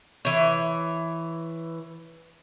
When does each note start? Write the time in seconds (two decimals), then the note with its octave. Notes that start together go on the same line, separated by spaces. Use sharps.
0.25 E3 C#5